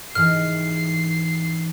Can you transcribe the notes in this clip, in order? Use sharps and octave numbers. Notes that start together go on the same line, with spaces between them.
G#2 E3 F6 C7